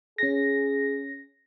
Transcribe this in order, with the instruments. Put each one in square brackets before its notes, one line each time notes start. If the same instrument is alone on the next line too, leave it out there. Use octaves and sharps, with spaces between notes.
[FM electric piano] C#4 A#6 [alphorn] G#4